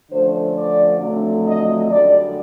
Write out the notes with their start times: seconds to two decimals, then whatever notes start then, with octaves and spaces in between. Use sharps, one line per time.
0.11 D3 F3 A3 C#4 C5
0.55 D5
0.99 F2 D3 F#3 A3
1.44 D#5
1.89 F#2 D3 G3 D5